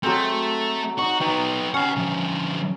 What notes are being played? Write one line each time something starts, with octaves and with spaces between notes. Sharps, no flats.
F#3 G#3 A3 C4
D#4 F#4 C#6
B3 D#4 G5
C#4 D#5 F#5
D3 F3